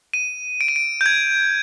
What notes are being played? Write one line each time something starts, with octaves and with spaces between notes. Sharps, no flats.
D#7
D7
D#7
D7
G6
G#6